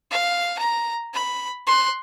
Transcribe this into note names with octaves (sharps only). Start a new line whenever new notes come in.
F5
A#5
B5
C6 F#6